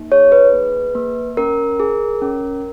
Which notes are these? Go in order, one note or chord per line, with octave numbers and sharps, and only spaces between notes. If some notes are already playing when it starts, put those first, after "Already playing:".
Already playing: A#3 D#4
G#4 C#5
B4
A#3
A#3
C#4 A#4
G#4
C#4